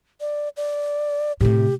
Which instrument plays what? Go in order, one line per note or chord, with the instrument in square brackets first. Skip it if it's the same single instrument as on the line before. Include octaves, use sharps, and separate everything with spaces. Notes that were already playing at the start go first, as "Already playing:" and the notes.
[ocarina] D5
D5
[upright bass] A2 C3 [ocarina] G4